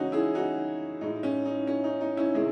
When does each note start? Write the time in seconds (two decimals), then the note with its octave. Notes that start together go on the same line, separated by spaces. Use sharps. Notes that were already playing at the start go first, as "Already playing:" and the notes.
Already playing: C#3 E3 G#3 C#4 D#4 F#4
0.12 E4 G#4
0.35 D#4 F#4
1.01 A2 G#3 D#4
1.23 C#4
1.45 D#4
1.67 C#4
1.84 D#4
2.01 D#4
2.17 C#4 E4
2.34 C3 D#3 G#3 E4 G#4